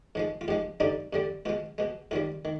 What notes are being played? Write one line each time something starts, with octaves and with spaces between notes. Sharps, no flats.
G#2 F3 G#3
F4
G#2 F3 G#3 G4
G2 D3 G3 D#4
G2 D3 G3
B2 G#3 F4
B2 G#3
G#2 D#3 G3 F4
D#3